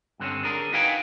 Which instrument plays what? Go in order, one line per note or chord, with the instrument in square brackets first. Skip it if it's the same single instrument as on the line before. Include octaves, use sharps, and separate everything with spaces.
[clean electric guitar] G2 D3 C4 C#4
D4 G#4 A#4
D#4 F#4 B4 F5 G5 G#5